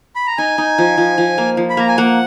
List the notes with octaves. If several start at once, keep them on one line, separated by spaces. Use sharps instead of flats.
B5
A#5
D#4 G#5
D#4
F3
F3
F3
A#3
F3
B5
A#3 A#5
G#5
A#3 F#5